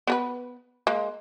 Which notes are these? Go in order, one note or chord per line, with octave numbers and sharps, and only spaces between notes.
B3 A#4 B4
G#3 A#3